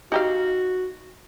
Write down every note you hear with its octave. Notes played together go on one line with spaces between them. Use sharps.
D#4 F#4 G4 F5